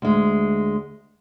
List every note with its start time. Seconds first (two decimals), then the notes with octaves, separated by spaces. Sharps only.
0.02 D2 G#3